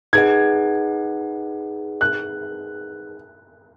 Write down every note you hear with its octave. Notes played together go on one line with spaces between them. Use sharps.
D#4 G#4 B4 D#5 F#5 G#6
F#6